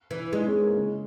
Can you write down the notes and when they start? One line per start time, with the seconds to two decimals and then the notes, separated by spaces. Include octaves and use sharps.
0.11 E3 E4
0.33 G#3 D#4
0.47 C#4
0.61 A#3
0.77 C#3